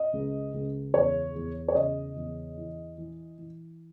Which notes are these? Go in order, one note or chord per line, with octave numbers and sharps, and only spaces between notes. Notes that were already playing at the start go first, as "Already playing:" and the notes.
Already playing: D#5
C#2
C#2
E2 C#5
E2
C#5
C#3 D#5
E2
E3
E3
E3